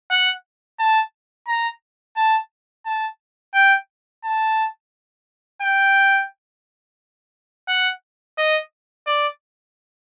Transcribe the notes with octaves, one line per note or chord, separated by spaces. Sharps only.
F#5
A5
A#5
A5
A5
G5
A5
G5
F#5
D#5
D5